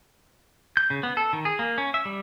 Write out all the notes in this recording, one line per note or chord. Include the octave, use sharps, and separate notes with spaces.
G6
C#3
B3
A4
D#3
G#4
A#3
C#4
E5
G3